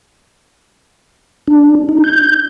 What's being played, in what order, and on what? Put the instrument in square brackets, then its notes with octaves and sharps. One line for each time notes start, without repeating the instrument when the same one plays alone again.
[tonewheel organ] D4
D#4
G6